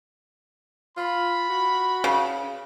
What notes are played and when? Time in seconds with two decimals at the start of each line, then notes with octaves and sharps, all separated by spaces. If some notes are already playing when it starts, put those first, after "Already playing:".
0.97 F4 B5
1.50 F#4
2.04 C#3